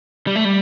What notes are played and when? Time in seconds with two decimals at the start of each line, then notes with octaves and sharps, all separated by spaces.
0.27 G3
0.36 A3
0.45 G3